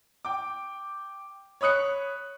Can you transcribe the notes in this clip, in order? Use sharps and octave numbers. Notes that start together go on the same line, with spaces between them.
G5 D6
C#5 B5 D#6 F#6 C#7